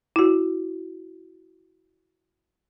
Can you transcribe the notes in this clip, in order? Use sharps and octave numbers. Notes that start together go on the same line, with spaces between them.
E4 F#4